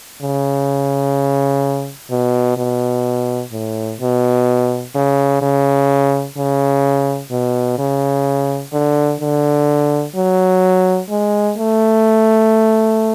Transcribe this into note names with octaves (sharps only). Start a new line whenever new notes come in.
C#3
B2
B2
A2
B2
C#3
C#3
C#3
B2
C#3
D3
D3
F#3
G#3
A3